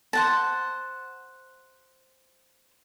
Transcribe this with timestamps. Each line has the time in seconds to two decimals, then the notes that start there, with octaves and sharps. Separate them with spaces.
0.13 C5 F#5 A5